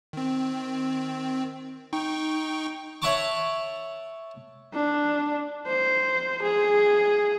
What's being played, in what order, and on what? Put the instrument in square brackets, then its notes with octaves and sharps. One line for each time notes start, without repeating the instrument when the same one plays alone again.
[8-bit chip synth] D#3 C4
D#4 G5 C#6
[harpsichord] C#5 E5 F#5 A5 C#6 D6
[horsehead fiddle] D4
C5
G#4